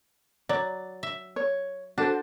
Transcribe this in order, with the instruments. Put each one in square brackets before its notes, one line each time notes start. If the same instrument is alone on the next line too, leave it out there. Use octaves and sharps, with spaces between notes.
[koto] F#3 [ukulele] D5
[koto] E5
[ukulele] C#5
[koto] D4 [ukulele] F#4 A4 C5